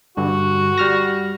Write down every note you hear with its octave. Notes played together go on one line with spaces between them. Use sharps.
G2 D3 F#4
G3 F6 A#6